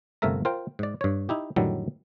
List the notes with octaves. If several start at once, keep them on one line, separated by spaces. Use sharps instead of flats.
G1 C3 A3 A#4 E5 A#5
F4 A#4 C5 G5
G#2 D5
G2 C#5
D#4 E4 G4
F2 A2 D3 D#3 F#3 G3